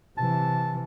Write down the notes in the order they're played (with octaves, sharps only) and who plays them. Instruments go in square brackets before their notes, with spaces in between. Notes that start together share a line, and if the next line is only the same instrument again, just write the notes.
[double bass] C3 E3 [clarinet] A5